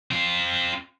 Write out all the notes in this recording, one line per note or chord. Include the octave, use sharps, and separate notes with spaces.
C4 F4